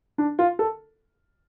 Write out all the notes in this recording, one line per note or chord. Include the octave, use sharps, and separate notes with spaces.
D4
F4
A4